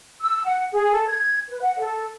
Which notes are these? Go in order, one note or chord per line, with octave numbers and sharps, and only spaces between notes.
E6
F#5
G#4
A4
G#6
B4
F#5
A4